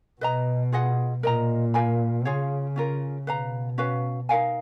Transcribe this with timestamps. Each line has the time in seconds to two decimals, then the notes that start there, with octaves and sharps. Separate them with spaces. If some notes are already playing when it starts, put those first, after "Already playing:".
0.21 B2 B4 D#5 A#5
0.72 F4 G#4 D#5 F#5
1.23 A#2 A#4 D#5 A#5
1.74 A#4 F5 G#5 B5
2.25 C#3 F4 G#4 C#5 F5
2.76 C#4 F4 A#4
3.27 B2 B4 F5 A#5
3.78 C#4 F#4 B4 F5
4.29 D#4 A#4 F5 G#5